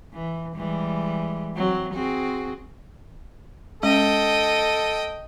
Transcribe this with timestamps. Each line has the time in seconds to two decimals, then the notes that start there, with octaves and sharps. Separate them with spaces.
0.14 E3
0.56 E3 G3 G#3
1.55 F#3 C4
1.94 C4 F#4 G#4
3.83 G#3 C#4 A4 D#5 G5